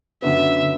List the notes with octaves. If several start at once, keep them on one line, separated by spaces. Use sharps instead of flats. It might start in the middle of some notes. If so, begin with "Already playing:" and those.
F#2 D3 B3 E5
D3